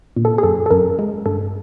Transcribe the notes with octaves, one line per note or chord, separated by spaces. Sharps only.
A#2
A4
G#4
F#2 A4
A4
F#2 A#4
G#3
G2 A4